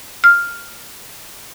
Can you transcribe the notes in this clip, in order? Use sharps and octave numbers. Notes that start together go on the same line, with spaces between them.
F6